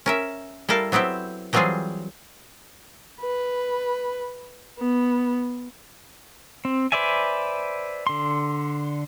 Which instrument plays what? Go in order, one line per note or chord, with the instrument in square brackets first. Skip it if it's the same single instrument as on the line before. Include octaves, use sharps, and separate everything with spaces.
[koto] C#4 A#4 E5
G3 E4 A4 A#4 F5
F#3 B3 C4 E4 G4
E3 F#3 G3 C4 F4 G#4
[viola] B4
B3
[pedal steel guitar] C4
B4 C5 D5 E5 G#5
D3 C6